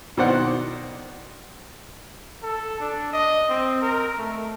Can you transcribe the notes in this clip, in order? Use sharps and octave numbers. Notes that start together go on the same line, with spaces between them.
B2 D#3 C5 D5 F#5
A4
D4
D#5
C4
A#4
A3